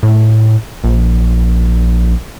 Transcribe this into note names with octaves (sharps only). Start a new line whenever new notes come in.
A2
A#1